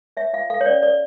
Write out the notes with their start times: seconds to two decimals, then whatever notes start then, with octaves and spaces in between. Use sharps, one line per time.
0.17 C#5 E5
0.33 F4 F5
0.50 A4 F5
0.61 C#5
0.66 C#4 D5
0.83 C#5 D5